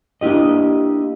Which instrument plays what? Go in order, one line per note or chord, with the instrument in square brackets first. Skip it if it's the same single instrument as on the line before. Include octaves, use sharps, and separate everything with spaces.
[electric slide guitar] A#3 D4 E4 G4 D#5